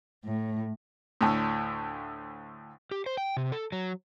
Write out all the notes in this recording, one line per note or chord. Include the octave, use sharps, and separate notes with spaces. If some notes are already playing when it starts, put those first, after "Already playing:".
A2
D2 A2
G4
C5
G5
C3
A4
F#3